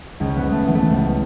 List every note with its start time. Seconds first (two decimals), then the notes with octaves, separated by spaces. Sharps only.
0.20 C#2 C#4
0.36 B3
0.43 C#2
0.52 A3
0.67 E3 B3
0.75 A3
0.82 B3
0.90 C#2